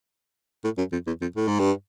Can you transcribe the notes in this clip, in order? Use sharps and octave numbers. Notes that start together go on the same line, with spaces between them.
A2
F#2
F2
E2
F2
A2
G#2
G2